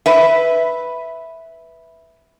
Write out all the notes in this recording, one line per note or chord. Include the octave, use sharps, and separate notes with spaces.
B4 E5